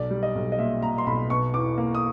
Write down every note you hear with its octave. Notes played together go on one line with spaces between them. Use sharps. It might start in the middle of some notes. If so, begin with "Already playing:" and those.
Already playing: B1 D5
G3
D#5
B1
D#5
A#2 E5
A#2 A#5
C6
B1 B5
B2 C#6
E2 D6
A#3
D#6